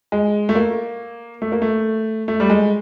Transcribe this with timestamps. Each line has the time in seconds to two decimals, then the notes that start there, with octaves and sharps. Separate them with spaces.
0.12 G#3
0.49 A3
0.55 A#3
1.42 A3
1.52 A#3
1.62 A3
2.28 A3
2.40 G3
2.50 G#3